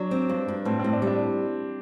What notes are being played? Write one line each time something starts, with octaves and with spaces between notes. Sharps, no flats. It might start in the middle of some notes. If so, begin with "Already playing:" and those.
Already playing: F#3 D4
C4
G2
G2
A2 C4
C4
A2
D4
G3
D4